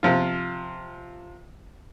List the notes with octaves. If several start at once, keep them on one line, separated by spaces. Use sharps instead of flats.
C3 F3 F4